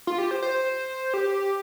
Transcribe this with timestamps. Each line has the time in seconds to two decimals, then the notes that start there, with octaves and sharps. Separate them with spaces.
0.07 F4
0.18 G4
0.31 C5
0.42 C5
1.14 G4